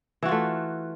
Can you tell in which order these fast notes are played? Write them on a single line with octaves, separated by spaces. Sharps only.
E3 F#4 F4 A3